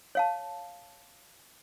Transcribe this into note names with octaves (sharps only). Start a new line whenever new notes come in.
C#5 F5 A5